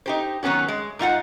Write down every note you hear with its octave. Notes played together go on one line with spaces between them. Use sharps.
D#4 G4 C5
D#3 F#3 B3 C#4 F#4
G#3
G#2 D#4 F4 F#5